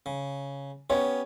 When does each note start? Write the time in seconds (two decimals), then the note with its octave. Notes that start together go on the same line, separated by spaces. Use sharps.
0.06 C#3
0.90 B3 C#4 G4 C#5